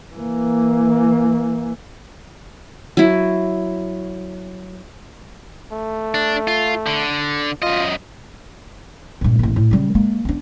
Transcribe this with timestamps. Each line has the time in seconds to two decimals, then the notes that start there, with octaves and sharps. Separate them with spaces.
0.15 E3 A#3
2.97 F#3 E4
5.73 A3
6.14 D4
6.48 F4
6.87 D3
7.62 F#2 F4 D#5
9.21 G2 A#2
9.39 A1 A#3
9.56 A2
9.71 C#3 G3
9.95 G#3 A#3
10.25 B3 D4